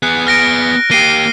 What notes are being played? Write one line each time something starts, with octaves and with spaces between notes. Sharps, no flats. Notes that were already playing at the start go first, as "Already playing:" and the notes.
B3 G#4 F#6
F6 A#6 D7
A#3 G4 C7 D#7 G7